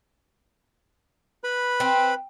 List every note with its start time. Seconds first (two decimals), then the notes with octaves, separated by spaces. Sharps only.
1.44 B4 B5
1.80 C4